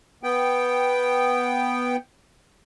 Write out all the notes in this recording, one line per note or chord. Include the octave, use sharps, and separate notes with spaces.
B3 G5